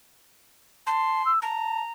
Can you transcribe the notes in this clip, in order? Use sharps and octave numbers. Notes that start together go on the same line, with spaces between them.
A5 C6
E6
A5 A#5